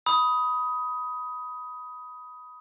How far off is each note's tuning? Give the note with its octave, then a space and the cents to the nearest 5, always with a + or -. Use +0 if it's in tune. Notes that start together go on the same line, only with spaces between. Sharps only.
B5 +0 D#6 +15